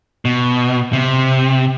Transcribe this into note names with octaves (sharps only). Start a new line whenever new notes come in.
B2
C3